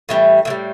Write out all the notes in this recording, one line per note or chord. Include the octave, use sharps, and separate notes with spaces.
A2 E3 G3
A2 E3
G3